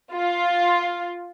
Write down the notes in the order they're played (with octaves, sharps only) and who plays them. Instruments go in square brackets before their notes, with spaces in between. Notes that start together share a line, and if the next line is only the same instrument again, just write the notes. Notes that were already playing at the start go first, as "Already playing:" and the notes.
[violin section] F4